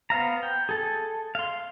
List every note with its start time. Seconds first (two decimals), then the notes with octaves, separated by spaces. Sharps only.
0.10 B3 C5 F5 A#5
0.43 G5
0.69 G#4 A4
1.35 F5 C6